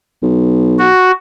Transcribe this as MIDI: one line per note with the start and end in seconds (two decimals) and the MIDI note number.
0.22 0.90 35
0.79 1.12 66